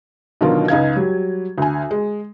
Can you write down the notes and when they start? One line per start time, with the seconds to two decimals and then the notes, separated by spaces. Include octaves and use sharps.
0.41 B2 D3 D#3 F#3 F4 A#4
0.68 C#2 D#4 F5 G#6
0.96 F#3 G3
1.58 D2 G#5
1.91 G#3